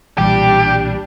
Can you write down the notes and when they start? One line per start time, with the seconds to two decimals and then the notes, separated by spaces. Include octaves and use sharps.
0.18 B1 A#2 E3 G3 D4 G4